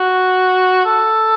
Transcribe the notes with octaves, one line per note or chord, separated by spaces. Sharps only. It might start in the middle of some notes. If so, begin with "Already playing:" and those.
Already playing: F#4
A4